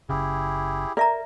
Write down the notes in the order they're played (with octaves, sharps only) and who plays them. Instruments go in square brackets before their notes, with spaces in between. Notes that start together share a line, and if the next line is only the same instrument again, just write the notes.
[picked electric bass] F#1 C#3 [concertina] E4 G4 G#4
[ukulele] A#4 [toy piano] D5 E5 A#5